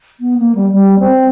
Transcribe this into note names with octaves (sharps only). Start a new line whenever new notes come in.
B3
A#3
G3
G3
C4